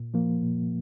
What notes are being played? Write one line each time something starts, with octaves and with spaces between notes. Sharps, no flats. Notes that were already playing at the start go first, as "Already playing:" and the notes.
Already playing: A#2
F3 A#3
A#2